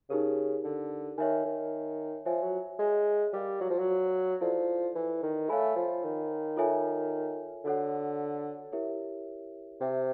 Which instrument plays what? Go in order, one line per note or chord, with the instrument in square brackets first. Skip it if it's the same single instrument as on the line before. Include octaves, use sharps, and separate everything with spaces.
[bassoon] C#3 [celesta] D#4 G4 A#4
[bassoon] D3
[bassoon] D#3 [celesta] C#5 E5 G#5
[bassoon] D#3
[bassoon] F3 [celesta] C#5 E5 G#5
[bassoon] F#3
G#3
[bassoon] G3 [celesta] A#4 D5 F5
[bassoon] F#3
F3
F#3
[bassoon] F3 [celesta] E4 A4 D5
[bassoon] E3
D#3
[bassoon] A3 [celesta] C#5 F5 G#5 B5
[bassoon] F3
D#3
[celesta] F4 A4 C#5 E5 G#5
[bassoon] D3 [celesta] F#4 A4 C#5 F#5
[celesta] E4 G4 A#4 C#5 E5
[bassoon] C3 [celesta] C5 E5 G5